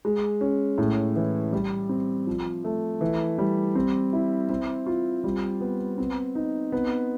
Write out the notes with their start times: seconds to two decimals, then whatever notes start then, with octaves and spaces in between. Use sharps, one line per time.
0.05 G#3
0.41 C#4
0.78 A2
1.16 E3
1.53 G3
1.89 C4
2.27 F3
2.64 A3
3.01 E3
3.38 G3
3.75 C4
4.13 E4
4.49 C4
4.86 F4
5.24 G3
5.61 B3
5.98 C4
6.35 D#4
6.72 B3